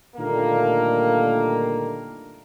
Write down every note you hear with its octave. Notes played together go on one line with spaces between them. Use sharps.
A#2 D3 D#3 G3 A3 A#3